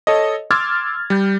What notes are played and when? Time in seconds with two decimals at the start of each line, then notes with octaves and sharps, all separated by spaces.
0.07 A4 C#5 D#5
0.51 C6 D6 E6 F6 G#6 A6
1.10 G3 G6